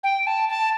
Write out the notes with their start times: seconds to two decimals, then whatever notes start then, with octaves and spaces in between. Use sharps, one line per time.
0.04 G5
0.27 A5
0.49 A5